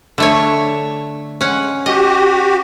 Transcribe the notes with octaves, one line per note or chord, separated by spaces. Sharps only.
D3 A3 C#5
G#3 C#4 F#5
F#4 G4 D#5